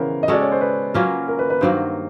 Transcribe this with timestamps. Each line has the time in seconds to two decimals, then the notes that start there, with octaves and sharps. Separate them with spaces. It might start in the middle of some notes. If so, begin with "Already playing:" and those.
Already playing: C#3 E3 B3 A#4 C5 C#5
0.23 D#5
0.28 G#3 C#4 F#4 A4 D5
0.42 C#5
0.52 C5
0.61 B4
0.94 F#3 A#3 C#4 F4
1.28 A#4
1.39 B4
1.50 B4
1.61 G2 D#3 F#3 A#3 C5